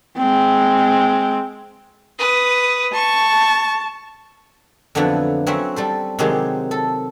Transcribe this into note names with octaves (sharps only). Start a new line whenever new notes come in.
G#3 C4
B4 D#6
A5 C#6
F2 D3 F3 F#3 B3 E4
F#3 C4 C#4 F#4 E5
G3 A4 C5
C3 D#3 F#3 G#3 G4
A4